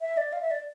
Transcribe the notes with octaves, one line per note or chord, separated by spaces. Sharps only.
E5
D5
F5
E5
D5